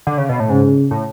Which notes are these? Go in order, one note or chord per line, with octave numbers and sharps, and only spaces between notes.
D3
C#3
B2
A2
G#2 C#3
A2